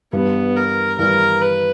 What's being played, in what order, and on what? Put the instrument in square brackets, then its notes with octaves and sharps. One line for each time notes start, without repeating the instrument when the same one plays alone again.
[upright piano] G2 E3 G3 [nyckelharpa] B3
[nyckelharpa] A#4
[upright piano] G2 E3 G3 [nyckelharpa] A#4
[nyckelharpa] B4